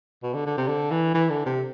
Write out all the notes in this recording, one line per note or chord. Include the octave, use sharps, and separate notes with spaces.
B2
D3
D3
C3
D3
E3
E3
D3
C3